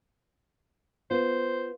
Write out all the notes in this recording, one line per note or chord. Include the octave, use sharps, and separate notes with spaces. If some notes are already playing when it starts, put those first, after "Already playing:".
B3 F4 C5